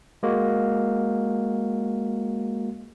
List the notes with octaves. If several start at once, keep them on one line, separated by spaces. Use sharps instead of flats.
G#3 A#3 F#4